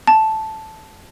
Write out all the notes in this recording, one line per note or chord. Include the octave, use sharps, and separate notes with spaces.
A5